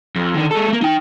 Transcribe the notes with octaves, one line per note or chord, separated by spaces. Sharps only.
F2
D3 D#3
G#3 A4
A3 A#3
D#4 G5